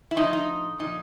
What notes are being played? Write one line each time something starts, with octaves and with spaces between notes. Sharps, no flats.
E4
A2 F3 D#4
D#4
A#2 F3 D#4